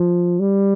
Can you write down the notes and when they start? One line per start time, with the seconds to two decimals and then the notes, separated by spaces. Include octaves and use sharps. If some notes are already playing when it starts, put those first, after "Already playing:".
Already playing: F3
0.40 G3